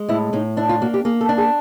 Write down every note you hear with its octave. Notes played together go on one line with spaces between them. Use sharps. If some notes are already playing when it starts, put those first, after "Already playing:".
Already playing: G#3
A2 E4
A2 D#4
D4 E4
F4
A#3 F#4
G4
A#3 G#4
A4
D4
G#4